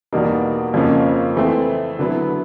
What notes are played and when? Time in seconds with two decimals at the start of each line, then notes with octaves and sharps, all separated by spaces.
0.13 E2 B2 G3 A#3 D#4
0.74 F2 C#3 F3 A#3 C#4
1.37 E3 A3 C4
1.99 D3 F#3 B3 E4